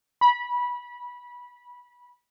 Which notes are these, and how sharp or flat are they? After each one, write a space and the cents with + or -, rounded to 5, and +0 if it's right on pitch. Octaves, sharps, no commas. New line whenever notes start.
B5 -20